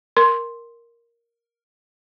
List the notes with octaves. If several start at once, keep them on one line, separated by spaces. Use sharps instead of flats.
A#4 C6